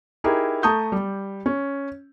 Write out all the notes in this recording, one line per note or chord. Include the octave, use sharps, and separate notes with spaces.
D#4 E4 G4 G#4 A#4
A3 A5 A#5 C#6 D#6 G6
G3
C#4